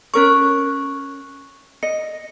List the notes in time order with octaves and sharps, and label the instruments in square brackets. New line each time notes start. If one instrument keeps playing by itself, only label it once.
[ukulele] C#4 A#4 C#5 [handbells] C#6 F#6
[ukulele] D#5 [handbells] C#7